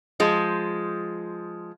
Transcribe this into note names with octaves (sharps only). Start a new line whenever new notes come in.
F3 G#3